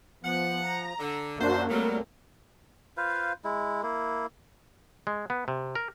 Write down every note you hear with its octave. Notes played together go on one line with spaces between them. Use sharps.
F3 B3 F#5
A#5
D3
F#2 A#3 D4 F#4 C5 E5
F#3 G3 A3 C4 A4 A#4
F4 B4 C5 F5
G#3 E4
A#3 E4
G#3
B3
C3
A#4